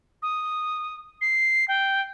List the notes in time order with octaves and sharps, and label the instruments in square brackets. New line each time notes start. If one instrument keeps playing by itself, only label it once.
[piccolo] D#6
C7
G5